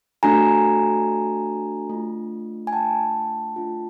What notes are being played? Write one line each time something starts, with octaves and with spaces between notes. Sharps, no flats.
A3 D4 F#4 A4 G#5 A#5
A3 D4 F4
G#5
G5 A5
A3 D4 F4